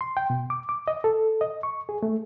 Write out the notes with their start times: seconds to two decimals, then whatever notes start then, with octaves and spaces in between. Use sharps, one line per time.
0.01 C6
0.17 G5
0.30 B2
0.50 D6
0.69 D6
0.88 D#5
1.04 A4
1.41 D#5
1.63 C#6
1.89 G#4
2.03 A3